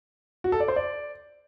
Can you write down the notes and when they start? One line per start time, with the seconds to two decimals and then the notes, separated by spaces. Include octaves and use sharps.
0.44 F#4
0.52 A4
0.60 D5
0.68 C5
0.76 D5